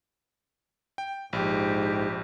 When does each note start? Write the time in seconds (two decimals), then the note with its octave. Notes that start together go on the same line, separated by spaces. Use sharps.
0.98 G5
1.33 A#1 G#2 G4